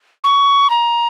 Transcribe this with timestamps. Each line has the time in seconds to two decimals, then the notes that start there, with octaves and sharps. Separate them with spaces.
0.24 C#6
0.70 A#5